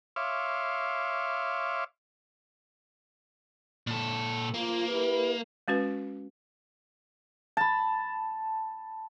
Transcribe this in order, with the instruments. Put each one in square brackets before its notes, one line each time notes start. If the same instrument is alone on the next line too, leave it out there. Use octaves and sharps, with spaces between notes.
[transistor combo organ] C#5 E5 F5 C6 D6
[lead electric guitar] A#2 A4
[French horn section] F3 F4 [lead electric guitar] A#3
[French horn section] E4 G4 B4
[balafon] G#3 C#4 F#4 B4
[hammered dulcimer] A5 B5